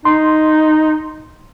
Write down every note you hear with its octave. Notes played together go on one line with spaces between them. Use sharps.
D#4 C6